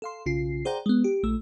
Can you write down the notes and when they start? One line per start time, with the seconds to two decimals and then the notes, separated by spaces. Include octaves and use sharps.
0.02 A4 F5 C6
0.26 B1 C#3 F4 C7
0.65 G#4 C5 D5 F#5 G5 A#5
0.86 G#3 B3
1.04 G4
1.23 A#1 A3 E6